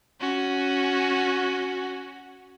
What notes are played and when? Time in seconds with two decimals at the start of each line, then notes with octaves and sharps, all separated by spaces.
0.20 C#4 F#4